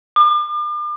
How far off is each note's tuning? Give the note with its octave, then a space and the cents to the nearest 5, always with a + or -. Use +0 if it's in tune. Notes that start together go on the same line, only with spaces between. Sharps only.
D6 +40